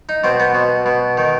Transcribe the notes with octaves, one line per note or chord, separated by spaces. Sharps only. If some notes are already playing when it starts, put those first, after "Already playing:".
D#4
B2 C4
B3
B2
B2
D#3